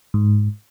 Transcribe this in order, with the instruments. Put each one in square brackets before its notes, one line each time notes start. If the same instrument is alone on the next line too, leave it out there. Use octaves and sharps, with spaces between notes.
[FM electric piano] G#2